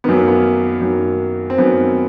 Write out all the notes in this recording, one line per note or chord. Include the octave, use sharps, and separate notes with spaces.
F#2 D#3 B3
A#3
B3
F#2 D#3
C4
F#2 D#3 B3